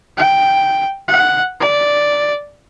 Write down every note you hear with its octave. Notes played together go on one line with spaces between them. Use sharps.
G5
F#5
D5